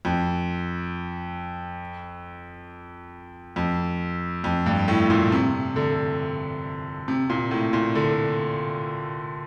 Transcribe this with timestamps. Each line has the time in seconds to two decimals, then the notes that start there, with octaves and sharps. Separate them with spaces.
0.05 F2
3.56 F2
4.44 F2
4.66 G2
4.88 A2
5.10 A#2
5.32 C3
5.76 D3
7.08 C3
7.30 A#2
7.51 A2
7.73 A#2
7.95 D3